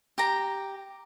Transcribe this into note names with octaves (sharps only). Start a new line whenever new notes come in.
G4 G5 A#5